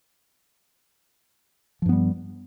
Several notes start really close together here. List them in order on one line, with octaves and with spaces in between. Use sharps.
F3 G2 B3 G3